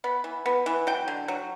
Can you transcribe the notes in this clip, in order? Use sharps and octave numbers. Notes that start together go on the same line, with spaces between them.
B3 B5
E3
B3
E3
F#3 G5
D3
F#3